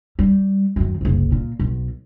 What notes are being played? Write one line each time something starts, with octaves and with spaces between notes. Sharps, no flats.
G3
F#2 D#3
F#1 C2
A#2
B1